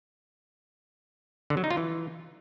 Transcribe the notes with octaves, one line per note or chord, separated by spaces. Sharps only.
D3
F#3
D#4
F4
E3